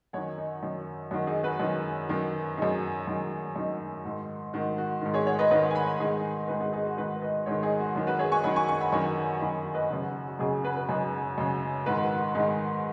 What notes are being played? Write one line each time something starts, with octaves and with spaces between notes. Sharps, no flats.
F#2 D#3 C#5 F#5
D#4
F#2 D#3
F#2 D#3 F#4
D#4 G#4
F#4 B4
F#2 D#3
F#2 D#3
F#2 D#3 D#4 G#4
F#2 D#3
F#2 D#3 D#4
G#2 D#3
G#2 D#3 F#4
F#4
G#2 D#3
G#4 C#5
C#5 F#5
B4 D#5
G#2 D#3 B4 D#5
G#5
F#5 B5
G#2 D#3 D#4 G#4
G#2 D#3 F#4 B4
D#4 G#4
D#4 G#4
F#4
G#2 D#3 F#4 B4
B4 D#5
G#2 D#3 G#4 C#5
D#4 G#4
F#4
F#2 D#3 F#4
F#4 B4
G#4 C#5
G#5 C#6
F#2 D#3 F#5 B5
G#5 C#6
G#5 C#6
F#5 B5
F#2 D#3 G#5 C#6
F#2 D#3 F#5 B5
B4 D#5
F#2 C#3 D#4
F#4
F#4
F#4
F#2 C#3 D#4 G#4
F#4 B4
B4
F#2 C#3 D#4 G#4
F#2 C#3
G#2 D#3 F#4 B4
F#4
F#4
G#2 D#3 D#4 G#4